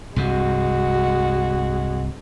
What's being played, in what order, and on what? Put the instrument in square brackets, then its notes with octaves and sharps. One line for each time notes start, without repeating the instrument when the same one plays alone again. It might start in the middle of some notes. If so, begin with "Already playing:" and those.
[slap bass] C2 G2 C3 [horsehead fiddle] G#3 F#4